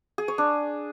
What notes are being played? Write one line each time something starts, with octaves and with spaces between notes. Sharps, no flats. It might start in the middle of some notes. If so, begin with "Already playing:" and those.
G#4
C#5
D4